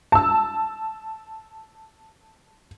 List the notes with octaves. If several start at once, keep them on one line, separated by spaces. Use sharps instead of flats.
A5 E6